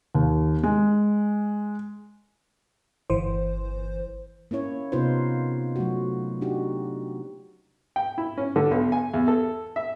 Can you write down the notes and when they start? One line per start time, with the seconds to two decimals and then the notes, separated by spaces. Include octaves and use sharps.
0.15 D#2
0.63 G#3
3.10 G1 E3 C5
4.51 A#3 C#4 E4 C#5
4.92 C3 B3 D#4 F4 B4 C5
5.76 F#3 A3 F#4
6.41 D4 D#4 F#4 G4
7.96 G5
8.18 E4
8.38 C#4
8.56 D3
8.71 B1
8.92 G#5
9.14 E2
9.28 A4
9.76 E5